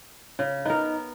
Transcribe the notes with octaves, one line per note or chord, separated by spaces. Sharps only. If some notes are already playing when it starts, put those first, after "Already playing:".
C#3
B3 D#4 A#4